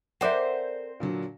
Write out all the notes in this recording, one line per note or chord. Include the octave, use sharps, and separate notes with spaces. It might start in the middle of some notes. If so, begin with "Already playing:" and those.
C4 A4 A#4 C5 D5 E5 F#5
A#2 D3 F#3